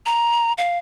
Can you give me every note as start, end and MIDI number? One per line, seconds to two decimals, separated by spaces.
0.06 0.52 82
0.58 0.78 77